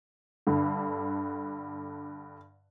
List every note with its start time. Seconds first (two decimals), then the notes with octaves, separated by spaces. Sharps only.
0.47 G2 D3